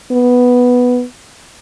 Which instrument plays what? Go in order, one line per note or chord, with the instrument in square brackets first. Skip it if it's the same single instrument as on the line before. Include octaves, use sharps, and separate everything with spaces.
[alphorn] B3